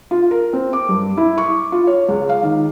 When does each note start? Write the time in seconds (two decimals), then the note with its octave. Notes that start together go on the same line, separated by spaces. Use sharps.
0.11 F4
0.31 A#4
0.53 C4
0.73 D6
0.89 G2
1.17 E4
1.38 C#6
1.72 F4
1.87 C#5
2.08 C#2
2.29 F5
2.43 D#3